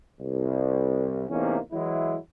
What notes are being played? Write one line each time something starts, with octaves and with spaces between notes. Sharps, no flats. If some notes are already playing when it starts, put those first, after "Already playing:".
C2
E2 A2 C3 A#3 C#4 D#4
E3 F#3 G#3 E4